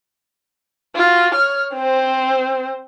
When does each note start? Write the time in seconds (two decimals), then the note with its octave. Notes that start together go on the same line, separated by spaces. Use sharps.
0.96 F4 F#4
1.34 C#5 F6
1.74 C4 C5